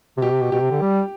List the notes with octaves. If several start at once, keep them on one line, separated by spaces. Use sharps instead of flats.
C3
B2 G4
C3
B2
B2 G4
C3
D3
G3